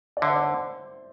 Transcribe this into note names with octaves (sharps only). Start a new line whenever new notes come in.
D5
D3 E5
C5
D5
C5